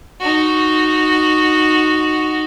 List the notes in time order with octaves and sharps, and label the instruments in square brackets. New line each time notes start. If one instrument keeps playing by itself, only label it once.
[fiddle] D#4 F#4